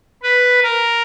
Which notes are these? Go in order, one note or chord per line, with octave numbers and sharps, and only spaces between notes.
B4
A#4